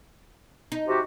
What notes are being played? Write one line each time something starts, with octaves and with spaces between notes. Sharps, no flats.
D#4
C3 F#4 G4